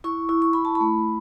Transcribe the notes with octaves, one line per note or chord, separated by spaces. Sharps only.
E4 C#6
E4
C#6
E4 B5
A5
B5
A3